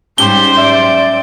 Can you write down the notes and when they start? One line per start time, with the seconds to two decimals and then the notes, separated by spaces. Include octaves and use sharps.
0.18 G#2 G3 C#4 G4 C5 G7
0.57 F#3 D5 E5